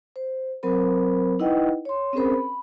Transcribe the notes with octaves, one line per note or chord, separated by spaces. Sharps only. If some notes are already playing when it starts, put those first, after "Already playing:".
C5
F#3 C4 A#4 C5 B5
D#4 E4 B4 D#5 F#5 G5
C#5 C6
C4 C#4 G#4 A#4 C5 B5
B5